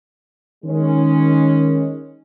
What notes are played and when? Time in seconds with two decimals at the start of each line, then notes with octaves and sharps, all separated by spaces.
0.64 D#3 G#3 C#4